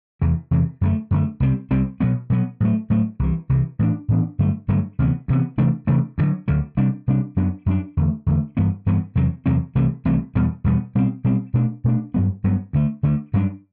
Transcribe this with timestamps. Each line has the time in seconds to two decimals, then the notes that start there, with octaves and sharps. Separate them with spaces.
0.21 E2 C3 E3
0.51 E2 C3 E3
0.81 F#2 D3 A3
1.11 F#2 D3 A3
1.40 C2 C3 G3 C4
1.71 C2 C3 G3 C4
2.00 B2 F#3 B3
2.30 B2 F#3 B3
2.60 A2 F#3 A3
2.90 A2 F#3 A3
3.19 C2 C3 E3
3.49 C2 C3 E3
3.79 A2 E3 B3 D4
4.08 A2 E3 B3 D4
4.39 G2 D3 F#3 A3
4.68 G2 D3 F#3 A3
4.99 D2 C3 E3 B3
5.28 D2 C3 E3 B3
5.58 C3 E3 A3 D4
5.87 C3 E3 A3 D4
6.18 D2 D3 F#3
6.48 D2 D3 F#3
6.77 C3 G3 D4
7.08 C3 G3 D4
7.36 F#2 F#3 B3 D4
7.66 F#2 F#3 B3 D4
7.97 E2 D3 A3
8.26 E2 D3 A3
8.57 G2 E3 B3
8.86 G2 E3 B3
9.15 E2 C3 F#3 C4
9.46 E2 C3 F#3 C4
9.75 C2 C3 E3 A3
10.05 C2 C3 E3 A3
10.35 E2 B2 G3 B3
10.64 E2 B2 G3 B3
10.95 B2 G3 C4
11.24 B2 G3 C4
11.54 B2 A3 D4
11.84 B2 A3 D4
12.14 G2 F#3 B3
12.44 G2 F#3 B3
12.73 D2 D3 A3
13.03 D2 D3 A3
13.33 G2 F#3 B3 D4